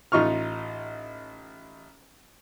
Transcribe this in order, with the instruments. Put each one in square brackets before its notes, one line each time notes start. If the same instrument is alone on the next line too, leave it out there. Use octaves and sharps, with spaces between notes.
[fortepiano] A1 D#4 F4 C#6 F6